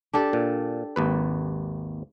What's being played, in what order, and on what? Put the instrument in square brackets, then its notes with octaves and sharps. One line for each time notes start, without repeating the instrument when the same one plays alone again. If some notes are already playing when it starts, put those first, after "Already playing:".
[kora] D4 G4 A4
[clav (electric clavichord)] A#2
G#1 D#2 B4